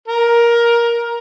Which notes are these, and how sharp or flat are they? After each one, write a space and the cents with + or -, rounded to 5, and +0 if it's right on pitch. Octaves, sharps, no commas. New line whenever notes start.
A#4 +15